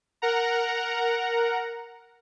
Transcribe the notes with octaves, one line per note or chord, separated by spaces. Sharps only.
A#4 F#5 A#5